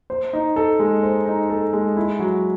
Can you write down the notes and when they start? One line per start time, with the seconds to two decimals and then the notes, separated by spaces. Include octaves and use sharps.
0.10 C5
0.33 D#4
0.56 A4
0.80 G#3
1.03 C5
1.26 D#4
1.50 A4
1.73 G#3
1.97 E4
2.19 F#3